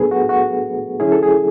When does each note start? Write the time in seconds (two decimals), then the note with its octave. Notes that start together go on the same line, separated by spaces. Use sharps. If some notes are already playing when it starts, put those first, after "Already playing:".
Already playing: A2 F#3 B3 D4 G#4 A4 B4
0.11 F#4
0.29 F#4
1.00 D3 F#3 C#4 E4 G#4
1.12 A4
1.23 G#4